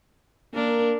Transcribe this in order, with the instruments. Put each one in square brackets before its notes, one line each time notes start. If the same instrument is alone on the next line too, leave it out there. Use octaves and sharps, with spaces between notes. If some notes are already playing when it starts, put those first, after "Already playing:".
[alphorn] A#3 [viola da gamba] D4 A#4